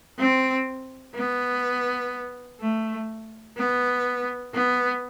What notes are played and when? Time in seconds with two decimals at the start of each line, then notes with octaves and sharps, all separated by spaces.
0.18 C4
1.15 B3
2.60 A3
3.57 B3
4.54 B3